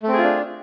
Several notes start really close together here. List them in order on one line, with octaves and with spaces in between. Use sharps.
A3 C4 G#4 F4 D4